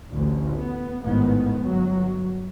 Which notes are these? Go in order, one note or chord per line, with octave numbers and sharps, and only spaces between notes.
A1 D2 D3
B3
A1 G#2 D#3 B3
G1 F#3